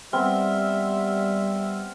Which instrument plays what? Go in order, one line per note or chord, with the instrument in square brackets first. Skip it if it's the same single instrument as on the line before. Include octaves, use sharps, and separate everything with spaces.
[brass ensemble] G3 [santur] B3 C4 [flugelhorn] E5 [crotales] F6